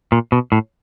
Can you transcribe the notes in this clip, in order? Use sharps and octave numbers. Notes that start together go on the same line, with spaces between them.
A#2
B2
A2